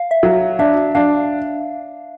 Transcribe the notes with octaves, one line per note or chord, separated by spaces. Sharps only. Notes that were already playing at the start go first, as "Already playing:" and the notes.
Already playing: F5
E5
F#3
D4 E5
D4 F5